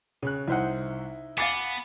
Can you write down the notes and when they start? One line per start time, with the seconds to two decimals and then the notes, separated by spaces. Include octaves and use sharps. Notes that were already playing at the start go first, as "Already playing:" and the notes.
0.23 C#3 C#5 F#6
0.48 C2 D#4 E4 C5 F#5
1.38 B3 F5 G#5 D6 A6 C7